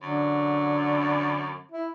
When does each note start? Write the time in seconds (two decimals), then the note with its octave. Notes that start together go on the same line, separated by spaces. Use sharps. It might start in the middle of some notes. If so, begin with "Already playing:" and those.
0.02 F#2 D3
1.72 E4